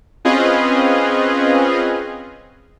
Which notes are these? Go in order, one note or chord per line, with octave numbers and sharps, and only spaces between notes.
C4 C#4 F4 G#4 B4 D#5